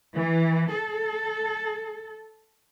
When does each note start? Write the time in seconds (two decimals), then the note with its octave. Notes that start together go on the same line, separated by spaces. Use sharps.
0.15 E3
0.71 A4